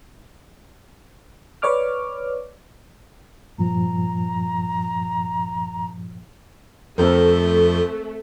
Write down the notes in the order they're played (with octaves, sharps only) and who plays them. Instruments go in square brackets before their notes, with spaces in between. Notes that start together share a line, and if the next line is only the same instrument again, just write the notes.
[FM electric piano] B4 C#5 D5 D6 F6
[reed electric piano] G2 A#2 F3 [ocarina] A#5
[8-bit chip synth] F2 F3 G6 [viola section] A3 [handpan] C4 A4 A#4